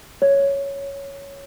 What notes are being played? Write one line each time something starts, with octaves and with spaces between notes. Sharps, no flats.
C#5